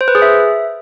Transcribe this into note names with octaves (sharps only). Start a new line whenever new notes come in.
C5
B4
G#4
E5